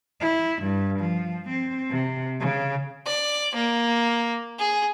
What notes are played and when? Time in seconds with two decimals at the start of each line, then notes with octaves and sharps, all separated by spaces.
0.21 E4
0.63 G2
1.00 F3
1.50 C4
1.91 C3
2.40 C#3
3.06 D5
3.55 A#3
4.59 G#4